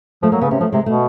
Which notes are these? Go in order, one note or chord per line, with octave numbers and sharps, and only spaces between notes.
F3 A3
F#3 A#3
C#3 B3
C3 C#4
F3 A3
C3 G#3
B2 A3